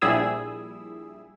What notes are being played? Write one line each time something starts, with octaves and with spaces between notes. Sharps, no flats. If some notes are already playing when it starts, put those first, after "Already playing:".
A#1 G3 E4 G#4 D#6 E6